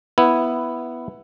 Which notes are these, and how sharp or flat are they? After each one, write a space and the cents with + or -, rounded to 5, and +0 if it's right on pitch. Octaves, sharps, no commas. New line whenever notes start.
B3 +0 E4 +5